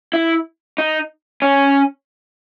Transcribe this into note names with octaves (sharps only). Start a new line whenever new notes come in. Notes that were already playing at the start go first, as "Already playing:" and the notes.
E4
D#4
C#4